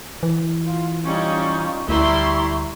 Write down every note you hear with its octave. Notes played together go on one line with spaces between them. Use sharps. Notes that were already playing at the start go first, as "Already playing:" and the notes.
E3
F4
G3 C#4 D#4 F4 C#6
D2 G3 E4 E5 A#5 C6 C#6